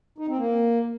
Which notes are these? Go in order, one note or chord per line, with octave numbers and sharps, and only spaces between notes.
D#4
C4
A#3